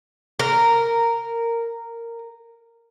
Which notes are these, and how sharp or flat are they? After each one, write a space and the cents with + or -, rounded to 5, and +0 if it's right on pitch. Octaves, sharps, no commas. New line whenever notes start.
A#4 -10